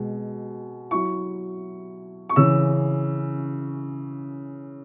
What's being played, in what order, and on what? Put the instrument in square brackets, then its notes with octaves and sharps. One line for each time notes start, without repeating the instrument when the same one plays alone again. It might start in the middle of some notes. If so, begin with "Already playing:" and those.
Already playing: [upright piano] B2 G#3
F#3 E4 C#6
C#6
C#3 E3 C#4 E6